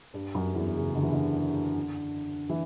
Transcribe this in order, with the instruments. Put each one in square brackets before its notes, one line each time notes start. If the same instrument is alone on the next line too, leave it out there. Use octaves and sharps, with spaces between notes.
[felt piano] G2 G3
F#2 F#3
E2 E3
C#3
D3
E3
D3
E3